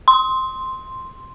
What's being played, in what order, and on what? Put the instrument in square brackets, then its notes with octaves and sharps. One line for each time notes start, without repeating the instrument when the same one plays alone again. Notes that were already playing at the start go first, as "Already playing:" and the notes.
[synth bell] C6